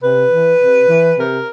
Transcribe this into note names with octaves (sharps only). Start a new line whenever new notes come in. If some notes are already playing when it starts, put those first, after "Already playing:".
C3 B4
E3
C3
E3
C3 A#4